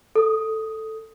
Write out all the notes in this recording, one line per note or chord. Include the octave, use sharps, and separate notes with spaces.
A4 D#6